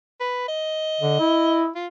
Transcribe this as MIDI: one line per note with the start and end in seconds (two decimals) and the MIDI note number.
0.20 0.46 71
0.48 1.65 75
1.01 1.17 50
1.20 1.69 64
1.75 1.87 65